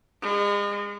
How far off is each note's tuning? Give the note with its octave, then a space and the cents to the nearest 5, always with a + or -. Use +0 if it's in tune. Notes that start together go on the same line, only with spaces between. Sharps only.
G#3 -35